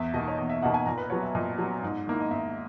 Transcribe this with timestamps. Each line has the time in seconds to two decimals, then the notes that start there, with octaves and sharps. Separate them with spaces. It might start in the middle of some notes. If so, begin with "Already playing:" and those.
Already playing: E2 E5
0.14 B2 A#3 D#4 D#5
0.28 C#5
0.38 E2 D#5
0.50 E5
0.62 B2 A#3 D#4 F#5
0.74 G#5
0.86 A#2 A#5
0.98 B4
1.10 F#3 B3 C#5
1.23 E5
1.35 A#2 D#5
1.58 F#3 B3
1.83 G#2
2.07 D#3 A#3 E4
2.20 D#5
2.31 G#2 E5